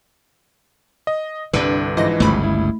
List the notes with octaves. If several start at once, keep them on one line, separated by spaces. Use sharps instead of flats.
D#5
C2 G2 D3 D4 B4
G#2 E3 F3 D#5 A#6
G1 C#2 G2 A3 B5
E4